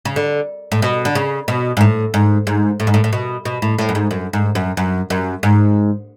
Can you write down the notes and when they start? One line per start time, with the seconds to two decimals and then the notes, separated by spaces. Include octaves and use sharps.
0.05 C#3
0.16 D3
0.72 A2
0.82 B2
1.05 D3
1.15 C#3
1.48 B2
1.77 G#2
1.81 A2
2.14 G#2
2.47 G#2
2.80 A2
2.87 G#2
2.94 A2
3.04 A2
3.13 B2
3.45 B2
3.62 A2
3.78 A2
3.89 F#2
3.95 G#2
4.11 F#2
4.33 G#2
4.55 F#2
4.77 F#2
5.10 F#2
5.43 G#2